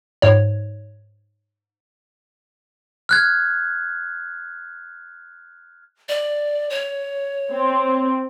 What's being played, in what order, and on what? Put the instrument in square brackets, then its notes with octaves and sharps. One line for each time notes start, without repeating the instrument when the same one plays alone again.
[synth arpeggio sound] G#2 C#5
[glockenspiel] F6 F#6 G#6
[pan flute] D5
C#5
[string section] C4